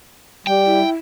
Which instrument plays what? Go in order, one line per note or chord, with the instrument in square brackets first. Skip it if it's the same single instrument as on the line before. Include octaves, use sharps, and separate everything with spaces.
[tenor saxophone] G3 [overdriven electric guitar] G5
[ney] E4